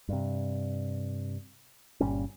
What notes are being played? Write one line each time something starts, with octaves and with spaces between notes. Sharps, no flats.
G2 C3
G1 A#2 G3 C#4